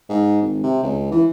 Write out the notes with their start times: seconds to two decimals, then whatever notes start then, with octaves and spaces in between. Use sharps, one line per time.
0.09 G#2
0.42 G#1
0.63 C3
0.83 C#2
1.12 E3